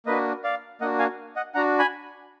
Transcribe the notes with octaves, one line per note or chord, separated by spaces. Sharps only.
A#3 D4 F#4 B4 D#5
D5 F5
A#3 D4 F#4 D#5 F#5
F5 G#5
D#5 F#5
D4 F#4 F#5 A#5
G#5 B5